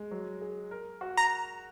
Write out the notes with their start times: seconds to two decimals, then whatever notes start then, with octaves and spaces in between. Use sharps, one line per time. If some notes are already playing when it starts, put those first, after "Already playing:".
Already playing: G#3
0.11 F#3
0.41 G#4
0.71 A#4
1.01 F#4
1.17 A#5